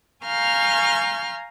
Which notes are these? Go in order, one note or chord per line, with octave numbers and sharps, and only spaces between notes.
F5 G#5 A#5 C#6 F6 G6